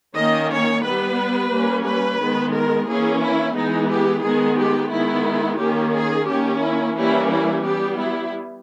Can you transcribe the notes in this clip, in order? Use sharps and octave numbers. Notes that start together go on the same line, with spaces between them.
D#3 A#3 C#4 D#5
C#5
G3 B3 B4
G3 A#3 C#4
B4
D#3 G#3 B3
A#4
E3 A#3 C#4 G#4
E4
E3 G#3 B3 D#4
G4
D#3 G#3 B3 G#4
G4
D#3 G#3 B3 E4
D#3 A#3 C#4 G4
G#4
D#3 A#3 C#4 G4
E4
E3 G3 A#3 C#4 E4
E4
G3 B3 G4
E4